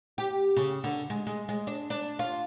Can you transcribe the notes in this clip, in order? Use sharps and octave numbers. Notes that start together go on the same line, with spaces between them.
G4
C#3
D3
G#3
G#3
G#3
D4
D4
F4